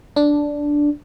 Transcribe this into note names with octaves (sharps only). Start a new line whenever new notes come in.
D4